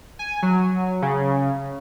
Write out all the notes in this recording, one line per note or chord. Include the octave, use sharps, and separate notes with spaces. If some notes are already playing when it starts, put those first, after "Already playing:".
G#5
F#3
C#3